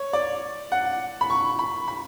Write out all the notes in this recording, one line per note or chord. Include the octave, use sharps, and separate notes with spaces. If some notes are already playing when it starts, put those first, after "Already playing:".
Already playing: C#5
D5
F#5
B5
C#6
B5
B5